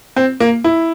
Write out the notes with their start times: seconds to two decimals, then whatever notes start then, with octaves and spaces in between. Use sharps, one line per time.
0.16 C4
0.40 A#3
0.64 E4